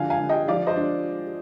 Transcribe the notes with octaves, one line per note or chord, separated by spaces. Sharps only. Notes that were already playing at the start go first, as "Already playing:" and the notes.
Already playing: D3 F3 F5 G#5
F5 G#5
D3
D#5 G5
F3 D5 F5
C5 D#5
D4